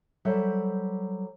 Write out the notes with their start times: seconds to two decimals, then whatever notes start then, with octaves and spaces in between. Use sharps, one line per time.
0.25 F#3 G3 A4 C5 E5